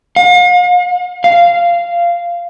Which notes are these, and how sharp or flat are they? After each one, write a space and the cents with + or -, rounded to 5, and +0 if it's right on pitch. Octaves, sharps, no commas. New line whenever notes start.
F5 +45
F5 -15